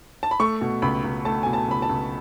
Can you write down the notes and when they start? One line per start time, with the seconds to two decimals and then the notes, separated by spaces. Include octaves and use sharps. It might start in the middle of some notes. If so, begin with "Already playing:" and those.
0.23 A5
0.31 B5
0.40 A3 C#6
0.61 B2
0.82 C#2 B5
1.04 C#2
1.25 A3 A5
1.43 B2 G#5
1.53 A5
1.68 C#2 B5
1.82 A5
1.89 C#2